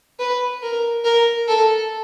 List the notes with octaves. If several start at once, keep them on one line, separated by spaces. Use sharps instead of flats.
B4
A#4
A#4
A4